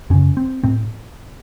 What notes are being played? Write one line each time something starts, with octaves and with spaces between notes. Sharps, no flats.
F#2 C#3 C#4
C4
A2 C4